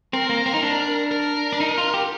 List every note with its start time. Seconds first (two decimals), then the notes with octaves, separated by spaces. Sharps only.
0.13 C4 A#4
0.29 A#3
0.46 C4
0.54 D#4
0.63 D4
1.11 A#4
1.53 D4
1.60 D#4
1.78 F4
1.94 G4